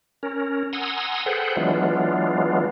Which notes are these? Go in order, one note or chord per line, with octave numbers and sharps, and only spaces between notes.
C#4 A#4
F#5 G#5 A#5 C6 D#6 E6
G#4 A4 B4 C5 F#5 G5
E3 F#3 G#3 B3 D4 F4